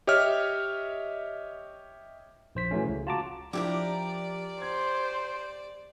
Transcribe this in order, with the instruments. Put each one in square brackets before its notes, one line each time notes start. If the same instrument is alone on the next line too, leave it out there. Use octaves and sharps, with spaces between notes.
[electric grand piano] G4 C#5 D#5 E5 F6
[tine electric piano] A#1 C5 B6
E3 F#3 A3 C#4
C#2 C#3
F4 F#4 A5 A#5 D6
[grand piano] F3 D4 E4 [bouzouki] G4 G#4 A#4 [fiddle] D5
[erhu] C5 [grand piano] G#6